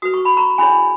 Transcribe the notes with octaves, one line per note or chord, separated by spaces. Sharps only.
F#4 B4 D#6
C#6
B5
A#5 C#6
C#4 E4 G#4 C#5 G#5 B5